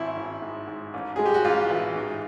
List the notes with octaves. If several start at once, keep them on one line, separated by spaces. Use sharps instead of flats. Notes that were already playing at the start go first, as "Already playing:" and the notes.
Already playing: G#1 E4
G#1
G#2
G#2
A1
G#3 G#4
G4
F#4
A1 F4
E3
G#2